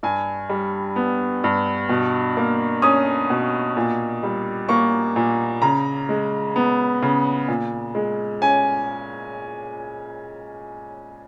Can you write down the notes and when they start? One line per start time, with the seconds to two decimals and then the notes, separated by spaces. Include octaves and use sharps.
0.03 G2 G#5
0.49 G3
0.96 B3
1.44 G2
1.89 B2
2.37 A#3
2.82 C#4 D#6
3.30 B2
3.77 A#2
4.23 G3
4.69 A#3 C#6
5.16 A#2
5.62 C#3 A#5
6.09 G#3
6.56 B3
7.02 C#3
7.48 A#2
7.95 G#3
8.42 C#4 G#5